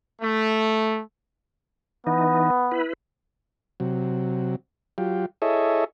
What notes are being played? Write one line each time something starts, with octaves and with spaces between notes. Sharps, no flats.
A3
E3 B3 D#4
E4 B4
C3 F#3
F#3 F4 G4
E4 G#4 A4 C#5 D#5 E5